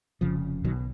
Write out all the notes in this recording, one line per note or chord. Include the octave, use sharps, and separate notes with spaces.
F1 F2 C#3 F3
B1 B2 D#3 F#3